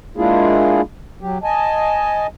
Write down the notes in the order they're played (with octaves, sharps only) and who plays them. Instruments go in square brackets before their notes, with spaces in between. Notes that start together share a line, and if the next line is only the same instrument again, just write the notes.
[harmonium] G#3 A#3 D4 E4 F4 G#4
F#3 G4
D#5 G#5 A5